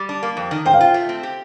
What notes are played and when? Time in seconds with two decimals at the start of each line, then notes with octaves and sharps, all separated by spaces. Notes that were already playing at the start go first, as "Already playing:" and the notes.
Already playing: G3
0.09 D4
0.23 A#3
0.37 F2
0.51 D#3
0.65 C5 G5
0.74 F5
0.80 F4 G5
0.94 A3
1.09 C4
1.23 G4